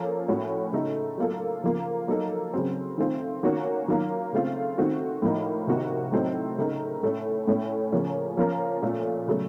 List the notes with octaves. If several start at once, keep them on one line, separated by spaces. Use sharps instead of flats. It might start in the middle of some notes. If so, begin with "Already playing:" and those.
Already playing: F3 A#3 C#4 A4
A2 A3 C#4 F#4
C#3 A3 D#4 A4
F#3 A#3 F4 A4
C#3 F3 A#3 F4
F#3 A#3 D#4 A4
C#3 F#3 C4
D#3 A3 C4 F4
D#3 A#3 C#4 F#4
D#3 F#3 A#3 F4 A#4
C#3 A3 C4 F4
D#3 A3 C4 F#4
A2 F3 A#3 D#4
C3 D#3 A#3 D#4 F#4
A2 F#3 C4 D#4 A4
C#3 A3 D#4 A#4
A2 A3 C#4 A4
A2 A3 C#4
C#3 F3 A#3 C#4
F3 A#3 C#4 F4 A#4
A#2 A3 C#4 F4 A4
C#3 F#3 A3